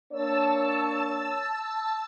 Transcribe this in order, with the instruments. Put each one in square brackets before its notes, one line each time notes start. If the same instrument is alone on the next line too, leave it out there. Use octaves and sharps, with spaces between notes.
[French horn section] A#3 D4 C#5 [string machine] A5 E6